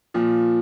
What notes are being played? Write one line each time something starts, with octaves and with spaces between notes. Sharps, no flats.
A#2 F3